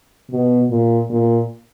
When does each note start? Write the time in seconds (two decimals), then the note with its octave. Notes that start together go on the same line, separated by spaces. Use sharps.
0.31 B2
0.70 A#2
1.10 A#2